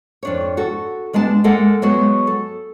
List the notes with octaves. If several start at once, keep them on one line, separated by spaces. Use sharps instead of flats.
F2 D4 C#5
F#4 A4
G3 G#3 B3 D4 A5
G#3 A#3 A4 A#4 D#5 F#5
F#3 G#3 B3 F#4
A4